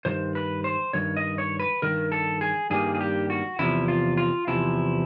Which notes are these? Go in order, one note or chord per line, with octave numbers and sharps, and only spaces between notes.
G2 D#3 C5
B4
C5
G2 D#3 C#5
D#5
C#5
B4
G2 D#3 A#4
A4
G#4
G2 D#3 G3 A#3 G#4
G#4
G4
F#4
E2 C3 F3 E4
F4
F4
E2 C3 F3 E4